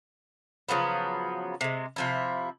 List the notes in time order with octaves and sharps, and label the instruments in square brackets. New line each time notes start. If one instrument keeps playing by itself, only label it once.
[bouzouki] C#3 F3 F#3 B3
C3 G#3
C3 F3 E4